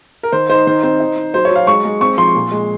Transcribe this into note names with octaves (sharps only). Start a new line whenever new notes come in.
A#4
D#3 C5
D#4 C5
D#3 C5
C4 C5
D#4
D#4
F#3 C5
C#5
F#3 F5
G#3 C#6
G#3
C4 C#6
F3 C6
A#2
G#3